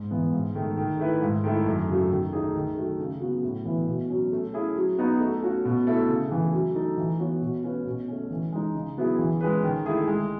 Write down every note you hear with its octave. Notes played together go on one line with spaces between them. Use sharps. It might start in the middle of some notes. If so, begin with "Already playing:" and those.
Already playing: G#2
E3 B3
G#2
D#3 A3
D#3
A3 E4 B4
G#2
D#3 A3 E4
F#2
C#3 F#3 A3
D#3
A3 D#4 G#4
D#3
F#3 A3
C#3
F#3 B3 F#4
A2
E3 B3 E4 B4
B2
F#3 C#4
A3
C#4 E4 G#4
F#3
B3 D#4 F#4
A3
C#4 F#4
B2
A3 E4 A4 E5
C#3
E3 A3
F#3
A3 D#4 A4
E3
B3 F#4 C#5
B2
A3 C#4 F#4 B4
B2
A3 C#4
E3
G#3 D#4
C#3
F#3 B3 E4 G#4
E3
G#3 C#4 G#4 B4
D#3
A3 E4 G#4
G#3